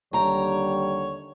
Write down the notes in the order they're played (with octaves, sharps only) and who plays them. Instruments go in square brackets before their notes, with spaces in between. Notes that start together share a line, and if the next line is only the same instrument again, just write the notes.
[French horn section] D#2 D3 G3 [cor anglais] C#5 [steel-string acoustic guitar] G5 A#5